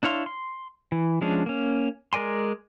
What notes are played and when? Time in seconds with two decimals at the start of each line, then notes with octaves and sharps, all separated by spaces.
0.03 D4 E4 C#5 F5 C6
0.26 C6
0.92 E3
1.21 F3 G#3 C#4 D4
1.46 A#3 C#4
2.13 G#3 A#4 D5 G#5 C6